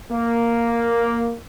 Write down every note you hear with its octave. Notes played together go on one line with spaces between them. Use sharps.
A#3